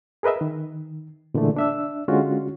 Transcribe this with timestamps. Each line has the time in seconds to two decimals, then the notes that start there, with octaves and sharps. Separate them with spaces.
0.23 G#4 A#4 B4 D#5 E5
0.41 D#3
1.34 A#2 D3 E3 G#3 A3
1.56 D4 E5 E6
2.08 D3 G#3 C#4 F4 F#4